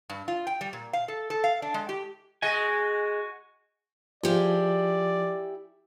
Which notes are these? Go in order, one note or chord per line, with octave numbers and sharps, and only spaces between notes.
G2
F4
G5
G3
A#2
F5
A4
A4
F5
D4
G#3
G4
G#3 F#4 D#5 G#5
F3 E4 G4 G#4 D5